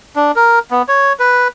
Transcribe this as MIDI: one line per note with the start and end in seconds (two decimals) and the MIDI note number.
0.16 0.32 62
0.36 0.59 70
0.71 0.82 59
0.88 1.13 73
1.19 1.48 71